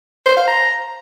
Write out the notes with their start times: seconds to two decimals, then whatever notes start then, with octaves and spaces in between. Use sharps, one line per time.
0.26 C5
0.37 F5
0.48 A#5